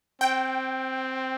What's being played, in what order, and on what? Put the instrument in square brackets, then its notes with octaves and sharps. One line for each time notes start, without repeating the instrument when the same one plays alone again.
[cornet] C4 [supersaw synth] G5